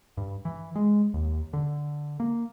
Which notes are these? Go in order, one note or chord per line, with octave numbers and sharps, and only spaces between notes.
G2
E3
G#3
D#2
D3
A#3